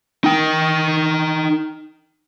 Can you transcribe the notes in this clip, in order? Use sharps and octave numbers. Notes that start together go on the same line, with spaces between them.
D#4 G5